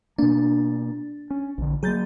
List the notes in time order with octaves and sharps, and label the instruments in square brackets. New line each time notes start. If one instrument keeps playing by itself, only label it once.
[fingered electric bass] B2 A#3 [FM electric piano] D4
[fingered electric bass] C#4
A#1 D3
[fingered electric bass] F#3 A#3 [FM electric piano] G#4 G6 A6